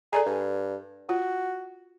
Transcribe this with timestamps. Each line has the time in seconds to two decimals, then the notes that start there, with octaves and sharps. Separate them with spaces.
0.13 G#4 A4 D5 A#5
0.26 G2
1.09 F4 F#4